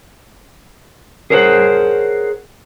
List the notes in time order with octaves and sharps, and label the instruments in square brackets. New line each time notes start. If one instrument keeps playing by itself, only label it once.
[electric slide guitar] G#4 A#4 C5 C#5 F5 F#5